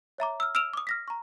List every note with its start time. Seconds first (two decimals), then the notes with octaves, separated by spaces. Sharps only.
0.18 C#5 E5 A#5 D6
0.40 E6 F6
0.55 E6 F6 D7 E7 F7
0.73 D6 D#6
0.87 F6 A#6 B6
1.08 A#5 C#6